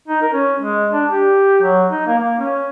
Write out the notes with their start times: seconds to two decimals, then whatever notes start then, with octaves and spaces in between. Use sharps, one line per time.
0.08 D#4
0.22 A#4
0.33 C#4
0.60 G#3
0.93 D4
1.10 G4
1.62 F#3
1.91 D#4
2.07 A#3
2.19 A#3
2.39 C#4